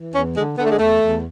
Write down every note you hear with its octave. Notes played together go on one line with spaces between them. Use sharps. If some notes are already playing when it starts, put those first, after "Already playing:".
Already playing: E3
E2 C#4
D3 G#3
D3 B3
A3
G#3
E2 A3
E2